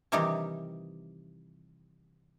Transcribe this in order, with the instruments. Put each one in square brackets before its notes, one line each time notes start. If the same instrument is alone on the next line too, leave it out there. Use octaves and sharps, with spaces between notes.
[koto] C3 D#3 E3 G3 D#4 G4